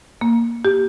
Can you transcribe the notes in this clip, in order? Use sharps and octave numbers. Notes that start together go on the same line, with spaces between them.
A#3
G4